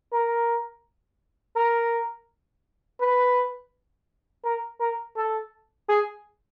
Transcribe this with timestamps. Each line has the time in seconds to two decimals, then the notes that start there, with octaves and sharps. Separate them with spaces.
0.13 A#4
1.56 A#4
3.01 B4
4.44 A#4
4.80 A#4
5.16 A4
5.89 G#4